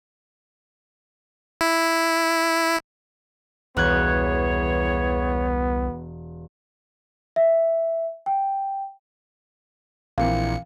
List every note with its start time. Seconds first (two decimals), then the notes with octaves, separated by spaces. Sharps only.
1.61 E4
3.77 E1 C2 E3 B3 G#4 C#5 F#6 G#6
7.36 E5
8.26 G5
10.18 A#1 A#2 E3 C4 F5 C#7